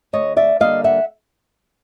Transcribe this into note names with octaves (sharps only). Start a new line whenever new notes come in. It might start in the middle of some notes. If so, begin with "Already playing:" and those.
D2 C#5 D#5
D5 E5
D3 G3 A#3 D#5 F5
E5 F#5